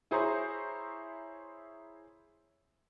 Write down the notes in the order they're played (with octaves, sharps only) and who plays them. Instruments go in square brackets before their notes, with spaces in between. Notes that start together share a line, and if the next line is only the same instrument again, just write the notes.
[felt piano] E4 G#4 C5 C#5 A#5 C6